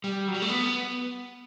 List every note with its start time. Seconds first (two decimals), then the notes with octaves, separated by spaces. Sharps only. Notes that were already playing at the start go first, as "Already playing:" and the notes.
0.04 G3
0.28 F#3
0.34 G3
0.42 A3
0.49 B3